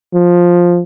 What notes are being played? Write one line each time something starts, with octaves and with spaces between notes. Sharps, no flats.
F3